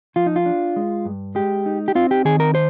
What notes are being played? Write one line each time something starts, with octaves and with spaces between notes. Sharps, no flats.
F3 F4
D#4
F4
D4
G#3
G2
G#3 G4
D#4
G4
C4 F4
G4
D#3 G#4
A#4
C5